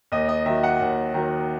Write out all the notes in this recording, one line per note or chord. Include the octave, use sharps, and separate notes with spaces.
D#2 D#5
D#5
D#3 F#3 E5
F#5
D#2
D#3 F#3